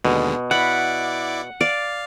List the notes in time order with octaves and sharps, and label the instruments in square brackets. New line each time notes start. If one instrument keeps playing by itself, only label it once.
[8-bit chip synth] D#2 D3 G#3 [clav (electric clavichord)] B2
[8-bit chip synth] E4 D5 D6 [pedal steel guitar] F#5 [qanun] B5
[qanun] D5 [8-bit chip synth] F5